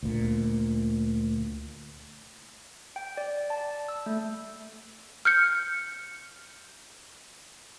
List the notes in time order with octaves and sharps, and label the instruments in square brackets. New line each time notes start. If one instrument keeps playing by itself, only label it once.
[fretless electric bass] D2 A#2
[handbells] G5
D5
A5
E6
A3
[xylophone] F6 G6 C#7